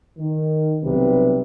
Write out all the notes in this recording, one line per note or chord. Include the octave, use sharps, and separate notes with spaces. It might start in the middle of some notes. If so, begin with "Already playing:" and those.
D#3
B1 C3 G3 B4